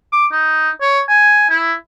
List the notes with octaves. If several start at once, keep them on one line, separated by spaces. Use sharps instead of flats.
D6
D#4
C#5
G#5
E4